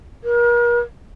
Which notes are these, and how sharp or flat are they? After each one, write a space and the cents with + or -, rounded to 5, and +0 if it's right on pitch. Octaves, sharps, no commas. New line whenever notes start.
A#4 +40